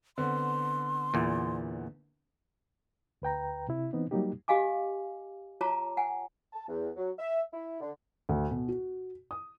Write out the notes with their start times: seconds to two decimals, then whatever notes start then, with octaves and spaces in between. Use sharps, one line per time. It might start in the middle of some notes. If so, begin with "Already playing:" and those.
0.18 D3 B3 C4 C6
1.14 E2 A#2
3.22 D2 B4 G5 A#5
3.69 C3 E4
3.93 E3 B3 C4 D#4
4.11 F#3 G3 A#3 D#4 G4
4.48 G4 D#5 F5 G#5 D6
5.61 F4 C#5 A5 A#5 D6
5.97 F#5 G#5
6.53 A5
6.68 E2
6.96 F#3
7.19 E5
7.54 E4
7.81 D3
8.29 D2
8.51 B2
8.68 F#4
9.31 D#6